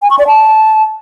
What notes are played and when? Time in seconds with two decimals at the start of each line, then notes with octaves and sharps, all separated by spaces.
0.02 G#5
0.11 C#6
0.19 D5
0.27 A5